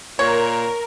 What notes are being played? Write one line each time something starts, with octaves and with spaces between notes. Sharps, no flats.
A#2 A#4 C#5